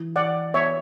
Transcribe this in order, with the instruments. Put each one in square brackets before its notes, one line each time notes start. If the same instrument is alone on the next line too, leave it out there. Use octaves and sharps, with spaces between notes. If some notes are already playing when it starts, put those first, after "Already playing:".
Already playing: [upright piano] E3
[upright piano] E3 [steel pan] D5 F#5
[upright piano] B3 [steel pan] C#5 E5